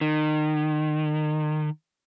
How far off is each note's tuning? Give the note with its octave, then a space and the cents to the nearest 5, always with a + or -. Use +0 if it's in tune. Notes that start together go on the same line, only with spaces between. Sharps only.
D#3 -30